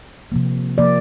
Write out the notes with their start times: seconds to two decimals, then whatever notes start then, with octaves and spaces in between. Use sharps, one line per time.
0.32 C3 F3 A#3
0.78 C3 F3 A#3 D5